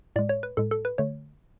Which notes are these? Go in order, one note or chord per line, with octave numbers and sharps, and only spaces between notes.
A2 G#3 D5
C#5
B4
A2 G#3 A4
A4
B4
D3 A3 C#5